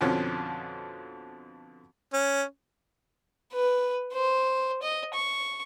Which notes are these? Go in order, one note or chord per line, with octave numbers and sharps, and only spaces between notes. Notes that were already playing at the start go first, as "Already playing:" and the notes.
F2 B2 D3 F3 C4 C#4
C#4
B4
C5
D#5
C#6